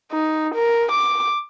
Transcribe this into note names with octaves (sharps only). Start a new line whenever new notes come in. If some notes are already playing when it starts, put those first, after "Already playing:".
D#4
A#4
D6